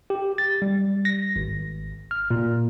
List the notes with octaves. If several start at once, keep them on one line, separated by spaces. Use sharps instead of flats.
G4
A6
G3
A#6
G#1
F6
A#2